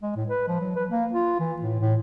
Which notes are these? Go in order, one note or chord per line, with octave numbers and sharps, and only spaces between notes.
G#3
A2
B4
F3
F#3
B4
A#3
F4
E3
A2
A2